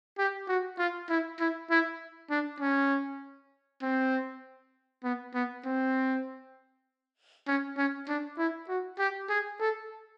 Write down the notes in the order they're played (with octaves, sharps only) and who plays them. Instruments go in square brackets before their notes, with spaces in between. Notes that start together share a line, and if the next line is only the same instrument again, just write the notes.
[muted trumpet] G4
F#4
F4
E4
E4
E4
D4
C#4
C4
B3
B3
C4
C#4
C#4
D4
E4
F#4
G4
G#4
A4